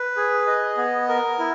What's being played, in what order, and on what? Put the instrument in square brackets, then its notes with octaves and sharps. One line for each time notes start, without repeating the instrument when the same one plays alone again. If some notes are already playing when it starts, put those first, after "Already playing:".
Already playing: [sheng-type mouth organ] B4
G#4
D#5
B3
A#4
E4